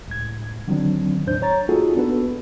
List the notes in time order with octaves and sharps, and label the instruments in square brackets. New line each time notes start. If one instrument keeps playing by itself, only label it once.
[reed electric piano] C#2 A2 G#6
D3 D#3 F#3 C4 D4
E2 A2 D4 C5 G6
C#5 A#5 A6
A#3 D#4 F4 F#4 G#4 A4
B3 D4 F#4 A4 B4